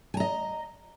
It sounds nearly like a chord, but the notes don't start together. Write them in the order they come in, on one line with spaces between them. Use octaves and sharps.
G#5 A#5 D#5